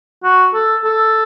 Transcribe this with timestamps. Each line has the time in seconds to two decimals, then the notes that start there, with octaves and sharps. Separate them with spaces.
0.24 F#4
0.54 A4
0.85 A4